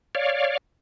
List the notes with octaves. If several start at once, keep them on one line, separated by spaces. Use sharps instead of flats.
C#5 D5 F5